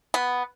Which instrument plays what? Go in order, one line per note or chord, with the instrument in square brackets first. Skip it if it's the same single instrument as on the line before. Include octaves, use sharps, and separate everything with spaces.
[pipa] B3